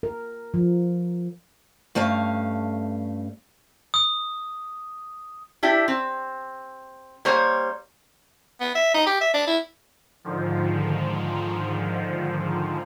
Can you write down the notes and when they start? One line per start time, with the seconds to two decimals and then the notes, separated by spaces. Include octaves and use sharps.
0.03 A#4
0.54 F3
1.95 G2 A3 C#4 F5
3.94 D#6
5.63 D4 E4 G4
5.88 C4
7.25 G3 A#3 C5 C#5
8.60 B3
8.75 E5
8.94 D#4
9.06 G4
9.21 E5
9.34 D4
9.47 E4
10.24 G#2 D3 D#3 F3